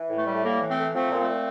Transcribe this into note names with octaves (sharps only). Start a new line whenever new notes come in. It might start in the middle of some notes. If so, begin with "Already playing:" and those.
Already playing: E3
A2
A3
G3
A3
A2 A#3
E3
A3 C4
A2
F3 A3 C4
A#2
A3 C4
A#2